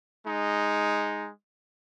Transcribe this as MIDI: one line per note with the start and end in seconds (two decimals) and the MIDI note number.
0.25 1.29 56
0.25 1.29 63